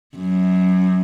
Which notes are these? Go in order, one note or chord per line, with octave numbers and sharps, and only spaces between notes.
F#2